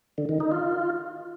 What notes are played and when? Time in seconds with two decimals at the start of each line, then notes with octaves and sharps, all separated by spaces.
0.18 D3
0.29 D#3
0.40 D#4
0.52 F4